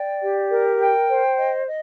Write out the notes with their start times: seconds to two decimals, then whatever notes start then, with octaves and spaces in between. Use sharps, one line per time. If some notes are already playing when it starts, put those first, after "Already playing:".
Already playing: D5 G5
0.22 G4
0.50 A#4
0.80 G5
1.09 C5
1.38 D#5
1.67 D#5